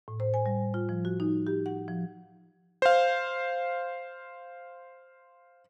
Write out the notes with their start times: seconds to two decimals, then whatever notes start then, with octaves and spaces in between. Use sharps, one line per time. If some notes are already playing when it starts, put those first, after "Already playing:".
0.08 A2
0.20 C5
0.34 G#5
0.46 G3
0.74 F4
0.89 F3
1.05 F#4
1.20 D#4
1.47 G4
1.66 F#5
1.88 F3
2.82 C5 F5